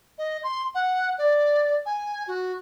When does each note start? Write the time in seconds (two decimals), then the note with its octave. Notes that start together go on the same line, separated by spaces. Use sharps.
0.18 D#5
0.44 C6
0.75 F#5
1.18 D5
1.86 G#5
2.28 F#4